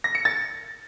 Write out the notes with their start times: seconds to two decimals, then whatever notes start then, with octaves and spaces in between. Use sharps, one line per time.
0.04 A#6
0.15 C#7
0.25 A6